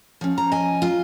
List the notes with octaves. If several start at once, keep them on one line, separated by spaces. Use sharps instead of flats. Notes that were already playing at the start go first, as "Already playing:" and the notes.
F3 C#4
A#5
D#5 G#5
F4